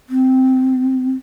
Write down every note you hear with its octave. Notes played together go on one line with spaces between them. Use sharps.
C4